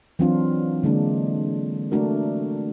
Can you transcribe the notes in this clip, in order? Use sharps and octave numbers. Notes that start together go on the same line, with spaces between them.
E3 F#3 C4 D4 F4
D3 G#3 A#3 D4
A3 D4 F#4 A#4